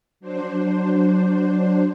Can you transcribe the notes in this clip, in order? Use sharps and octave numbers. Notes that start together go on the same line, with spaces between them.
F#3 D4 C5